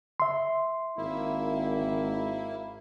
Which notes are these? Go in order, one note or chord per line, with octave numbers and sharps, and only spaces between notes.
E5 C6
G#1 A#3 E4